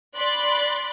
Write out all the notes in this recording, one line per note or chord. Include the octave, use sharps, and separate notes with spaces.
D5 B5 C6 F#6 A6